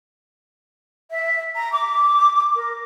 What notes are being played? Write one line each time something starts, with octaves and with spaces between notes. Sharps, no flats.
E5
A#5
D6
A#4